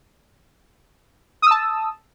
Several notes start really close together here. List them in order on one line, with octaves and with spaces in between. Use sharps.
D#6 E6 A5